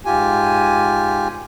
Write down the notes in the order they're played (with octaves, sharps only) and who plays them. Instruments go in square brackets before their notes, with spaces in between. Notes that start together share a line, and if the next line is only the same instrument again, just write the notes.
[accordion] G#2 F4 G4 G#5